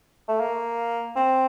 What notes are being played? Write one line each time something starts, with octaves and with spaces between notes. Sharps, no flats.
A3
A#3
C4